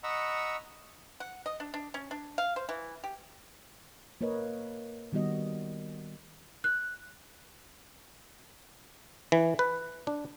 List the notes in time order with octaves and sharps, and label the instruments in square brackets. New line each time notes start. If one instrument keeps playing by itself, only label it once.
[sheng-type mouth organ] D#5 F#5 A#5 B5 C#6 E6
[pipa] F#5
D#5
D4
D4
C#4
D4
F5
C5
E3
G4
[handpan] A#3 A#4 B4 C#5 D#5
D#3 G3 B3 F#4 D#5
[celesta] F#6
[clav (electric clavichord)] E3
B4
D4